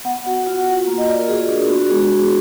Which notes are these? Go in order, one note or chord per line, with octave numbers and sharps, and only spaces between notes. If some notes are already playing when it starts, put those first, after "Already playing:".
B3 F#5
F#4 F#5
F4 F#5
F4 F#5
A#3
D#5
F4 D5
A#4
F#4 G#4
D4
B3 F#4
G#3 G#4